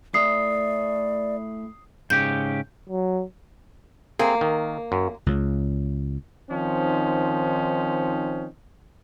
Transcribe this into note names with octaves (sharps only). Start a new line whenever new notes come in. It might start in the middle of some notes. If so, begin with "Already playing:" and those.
A3 E4 D5 D#6 C7
G#2 C#3 G4 G6
F#3
A#3 C4 G#4
D#3
F#2
C#2 C#3
D#3 F3 C4 C#4 D#4